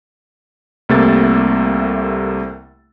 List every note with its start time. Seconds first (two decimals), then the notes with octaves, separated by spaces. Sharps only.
0.89 C2 C3 A3 A#3 E6 A6